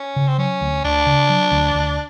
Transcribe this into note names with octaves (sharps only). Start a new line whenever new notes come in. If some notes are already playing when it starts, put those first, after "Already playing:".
Already playing: C#4
C#3
C4
F#3 C#4
D2
D2 D4
C#3
F#3
D2
D2